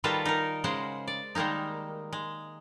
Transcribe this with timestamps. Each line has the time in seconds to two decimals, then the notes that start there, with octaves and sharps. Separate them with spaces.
0.04 D#3 G3 F4 F#4 A4 B4
0.25 D#4 A#4
0.64 C#3 G#3 C5 F#5
1.08 D5
1.35 D#3 G3 G#3 A#3 D#4
2.13 G#3